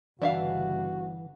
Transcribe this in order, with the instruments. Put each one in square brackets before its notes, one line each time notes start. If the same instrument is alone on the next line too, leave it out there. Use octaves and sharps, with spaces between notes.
[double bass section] G1 G2 C#3 [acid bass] E3 [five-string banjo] D4 E5 F5 [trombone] F#4